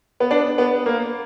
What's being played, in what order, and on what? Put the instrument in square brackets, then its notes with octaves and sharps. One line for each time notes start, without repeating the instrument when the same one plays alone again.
[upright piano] B3
D4
B3
A#3